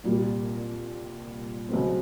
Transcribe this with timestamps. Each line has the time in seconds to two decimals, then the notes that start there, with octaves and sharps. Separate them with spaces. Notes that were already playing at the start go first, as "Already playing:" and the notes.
0.04 C2 A#2 G3
1.69 C#2 B2 F#3 A3 C4